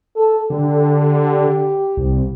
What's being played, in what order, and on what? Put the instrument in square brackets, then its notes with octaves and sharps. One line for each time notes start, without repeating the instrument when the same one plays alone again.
[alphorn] A4
[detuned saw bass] D3 [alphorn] G4
[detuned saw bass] C2